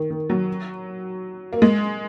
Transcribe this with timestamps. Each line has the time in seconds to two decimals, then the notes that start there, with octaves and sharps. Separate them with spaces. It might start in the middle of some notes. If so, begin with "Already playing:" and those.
Already playing: D#3
0.10 D#3
0.30 F#3
1.53 A#3
1.62 G#3